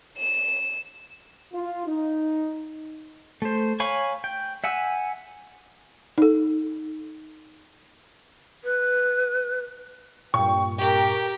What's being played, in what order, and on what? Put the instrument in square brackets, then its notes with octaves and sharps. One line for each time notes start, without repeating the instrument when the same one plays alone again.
[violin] E7
[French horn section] F4
D#4
[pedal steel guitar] A3 C5
C#5 F5 G#5 B5 C#6
G5
E5 F#5 G#5 E6
[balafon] D#4 A4
[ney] B4
[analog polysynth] G2 A#2 [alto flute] G5 [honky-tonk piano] C#6
[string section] G4 A#4 [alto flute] G5